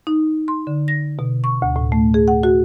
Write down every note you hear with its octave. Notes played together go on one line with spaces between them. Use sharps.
D#4
C6
D3
A#6
B2
C#6
D2
A2
A3
G#4
F#5
F#4